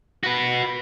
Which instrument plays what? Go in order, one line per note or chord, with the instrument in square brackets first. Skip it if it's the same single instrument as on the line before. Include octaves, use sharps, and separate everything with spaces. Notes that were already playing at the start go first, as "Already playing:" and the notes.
[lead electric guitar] F#4 B4